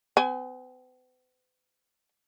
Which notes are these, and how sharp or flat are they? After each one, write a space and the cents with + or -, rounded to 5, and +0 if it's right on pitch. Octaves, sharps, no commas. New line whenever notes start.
B3 +45 G#5 +0